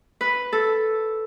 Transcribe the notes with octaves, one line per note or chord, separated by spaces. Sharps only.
B4
A4